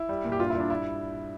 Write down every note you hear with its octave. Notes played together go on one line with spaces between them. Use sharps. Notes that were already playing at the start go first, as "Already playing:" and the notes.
Already playing: E4
G3
A#2
G4
G2 F4
E4
G2 D4
E4